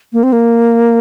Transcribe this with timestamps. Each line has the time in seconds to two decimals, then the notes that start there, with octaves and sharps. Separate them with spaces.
0.13 A#3
0.23 C4
0.33 A#3